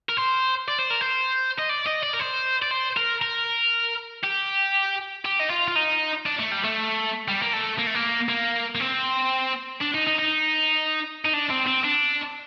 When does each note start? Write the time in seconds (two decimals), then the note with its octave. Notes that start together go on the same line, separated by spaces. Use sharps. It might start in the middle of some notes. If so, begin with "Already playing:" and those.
0.09 A#4
0.17 C5
0.68 D5
0.79 C5
0.90 A#4
1.01 C5
1.59 D#5
1.69 D5
1.87 D#5
2.03 D5
2.14 A#4
2.20 C5
2.62 D5
2.71 C5
2.97 A#4
3.22 A#4
4.23 G4
5.25 G4
5.39 D#4
5.50 F4
5.68 F4
5.76 D#4
6.26 D4
6.39 A3
6.52 G3
6.64 A3
7.28 G3
7.42 A#3
7.53 A3
7.78 A#3
7.87 A3
7.95 A#3
8.29 A#3
8.75 A#3
8.80 C4
9.81 D4
9.94 D#4
10.07 D#4
10.19 D#4
11.25 D#4
11.33 D4
11.50 C4
11.67 C4
11.84 D4